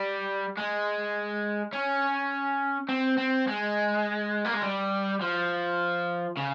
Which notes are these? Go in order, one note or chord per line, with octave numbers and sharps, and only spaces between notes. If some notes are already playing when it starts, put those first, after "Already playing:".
Already playing: G3
G#3
C#4
C4
C4
G#3
A#3
G#3
G3
F3
C#3